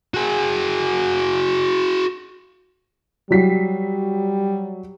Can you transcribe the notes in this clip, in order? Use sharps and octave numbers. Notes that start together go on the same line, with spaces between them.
F#4 G#4
F#3 G3 B6 C7